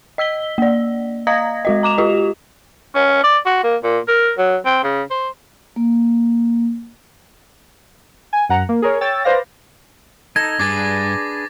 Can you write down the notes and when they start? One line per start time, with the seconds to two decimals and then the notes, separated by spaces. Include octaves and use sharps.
0.18 D#5 E6 B6 G7
0.58 A#3 D5
1.27 D#5 F5 A#5 D#6 G#6 A#6
1.65 G#3 F#4 D#5
1.83 A#5 D6 E7 F7
1.98 F4 G4 D#5
2.95 C#4
3.24 D5
3.46 F#4
3.64 A#3
3.83 A#2
4.08 A#4
4.38 F#3
4.65 C4
4.83 C#3
5.11 C5
5.76 A#3
8.33 G#5
8.49 F#2 F#5 A#5
8.69 A#3
8.82 G#4 A#4 C#5
9.01 C#5 G5 E6 A6
9.24 B4 C5 D5 F5 A#6
10.36 D#4 A4 G#6 A#6
10.59 G2 D4 G#4 B4 D6 A6